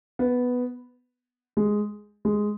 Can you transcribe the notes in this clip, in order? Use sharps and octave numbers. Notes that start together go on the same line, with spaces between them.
B3
G#3
G#3